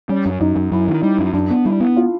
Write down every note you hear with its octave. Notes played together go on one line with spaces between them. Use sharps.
G3 C#4
F#2
F#2 D#4
F#2
F#2 E4
D#3
G3 D#4
F#2
F#2 D4
B3
G3 E4
B3
F4